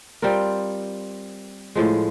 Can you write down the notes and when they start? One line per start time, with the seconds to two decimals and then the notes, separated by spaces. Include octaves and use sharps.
0.22 G3 C4 F4 A#4
1.75 A2 F3 G#3